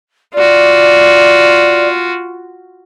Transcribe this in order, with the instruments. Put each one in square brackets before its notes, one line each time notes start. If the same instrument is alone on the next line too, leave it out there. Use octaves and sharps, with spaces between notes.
[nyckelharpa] F4 F#4 [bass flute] D5